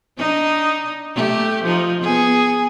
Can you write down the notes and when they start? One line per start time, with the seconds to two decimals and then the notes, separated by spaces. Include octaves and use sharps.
0.17 D4 D#4 D#5
1.14 A3 G4
1.63 F3 D#4
2.01 B3 G#4